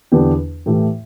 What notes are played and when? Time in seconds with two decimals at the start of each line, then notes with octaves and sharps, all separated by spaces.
0.12 E2 D3 B3 D4 G4
0.66 A2 E3 A3 G4